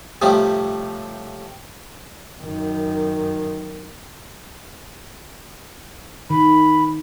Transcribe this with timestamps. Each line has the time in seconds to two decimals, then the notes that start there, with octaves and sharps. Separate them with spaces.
0.22 A2 C3 F3 G3
2.41 F#2 D#3
6.30 D#3 B5